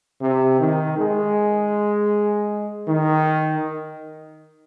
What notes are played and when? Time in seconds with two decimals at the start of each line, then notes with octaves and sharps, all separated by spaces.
0.21 C3
0.60 D#3
0.98 G#3
2.88 D#3